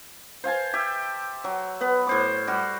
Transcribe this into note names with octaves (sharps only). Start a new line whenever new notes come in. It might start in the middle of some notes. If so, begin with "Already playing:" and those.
C5 F5 G#5 A5
G4 E5
F#3
B3 B4
A2 C5 D6
G3 F#4